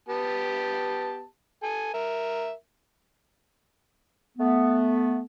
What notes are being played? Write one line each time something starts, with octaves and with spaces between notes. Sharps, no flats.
B3 G4 A5
A4 G#5
A#4 E5
A3 B3